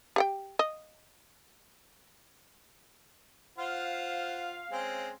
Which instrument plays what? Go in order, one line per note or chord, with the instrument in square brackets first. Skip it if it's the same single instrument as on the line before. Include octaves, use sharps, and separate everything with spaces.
[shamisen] G4 F#5 G5
D#5
[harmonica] F4 C5 F#5 [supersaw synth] F5
[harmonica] G#3 C4 C#4